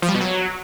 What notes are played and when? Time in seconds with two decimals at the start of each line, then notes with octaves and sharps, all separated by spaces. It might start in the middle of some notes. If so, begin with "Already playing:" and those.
0.02 F3
0.08 G3
0.15 B2
0.21 F#3